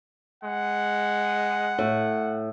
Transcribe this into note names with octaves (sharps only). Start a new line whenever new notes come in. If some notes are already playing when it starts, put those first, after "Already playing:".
G#3 F#5
A2